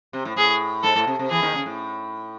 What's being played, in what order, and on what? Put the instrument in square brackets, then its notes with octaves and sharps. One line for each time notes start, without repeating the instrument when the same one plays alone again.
[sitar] C3
A2
[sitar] A2 [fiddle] G#4
[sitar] G#2 [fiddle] A4
[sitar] A2
C3
C3
[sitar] E2 E3 [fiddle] G#4
[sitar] D#2 D#3
C#3
A2